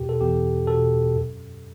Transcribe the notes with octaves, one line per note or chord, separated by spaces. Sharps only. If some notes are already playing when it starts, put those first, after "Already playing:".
Already playing: E2 B2 G4
A4
E2 G4
B2 A4
F#2